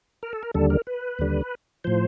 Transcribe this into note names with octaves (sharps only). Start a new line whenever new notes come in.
A#4
A4
A#4
D#2 D3 G3 A4
A#4
B4
D#2 D3 G3
A2 F3 C5